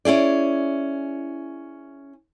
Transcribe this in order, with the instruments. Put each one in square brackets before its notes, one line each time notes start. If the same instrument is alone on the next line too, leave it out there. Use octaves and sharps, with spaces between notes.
[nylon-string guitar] C#4 E4 G#4 D5